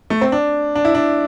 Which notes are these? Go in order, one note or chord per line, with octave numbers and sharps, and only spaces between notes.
A3
C4
D4
D4
E4
D4